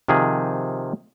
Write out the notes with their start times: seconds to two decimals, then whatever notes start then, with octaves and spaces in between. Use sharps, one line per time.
0.08 C3 D#3 F3 G#4